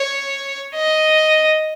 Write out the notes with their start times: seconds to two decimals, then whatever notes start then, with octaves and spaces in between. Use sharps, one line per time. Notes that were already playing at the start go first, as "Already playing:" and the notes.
Already playing: C#5
0.75 D#5